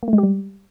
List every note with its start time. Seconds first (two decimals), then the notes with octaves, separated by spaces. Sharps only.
0.03 A#3
0.08 A3
0.13 G#3
0.18 G4
0.23 G3